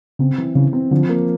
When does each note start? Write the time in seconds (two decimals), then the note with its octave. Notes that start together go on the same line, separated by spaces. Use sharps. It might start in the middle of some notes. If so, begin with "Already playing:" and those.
0.19 C#3 C4
0.38 E3
0.55 C#3 E3
0.73 C4
0.91 D3 F3
1.09 A#3